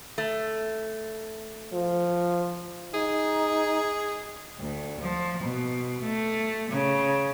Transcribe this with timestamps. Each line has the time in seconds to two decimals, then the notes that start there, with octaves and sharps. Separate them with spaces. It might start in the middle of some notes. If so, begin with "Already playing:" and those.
0.18 A3
1.74 F3
2.94 D#4 G#4
4.59 D2
5.00 F3
5.44 B2
6.03 A3
6.70 C#3